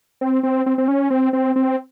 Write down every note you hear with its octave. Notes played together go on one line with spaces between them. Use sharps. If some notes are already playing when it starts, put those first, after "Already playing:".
C4
C4
C4
C4
C#4
C4
C4
C4